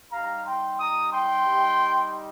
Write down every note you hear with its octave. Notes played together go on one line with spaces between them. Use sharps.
G3 D#4 G4 F5 A#5
G5 C6
A#5 D#6
G5 C6
G3 D#4 G4